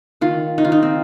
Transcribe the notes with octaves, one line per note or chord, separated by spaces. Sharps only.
D#3 F4
D#3 D#4
F4
D#4
C4